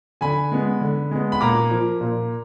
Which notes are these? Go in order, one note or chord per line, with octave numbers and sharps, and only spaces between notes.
D3 G#5 B5
G#3 B3
D3
G#3 B3
B5
A#2 A#5 D6
F3 A#3
A#2